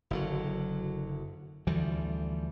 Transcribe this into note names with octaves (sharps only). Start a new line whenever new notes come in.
F#1 D3 F#3
D2 E3 F3 G3